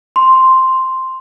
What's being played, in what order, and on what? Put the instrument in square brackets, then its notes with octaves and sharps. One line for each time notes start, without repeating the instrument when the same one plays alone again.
[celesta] C6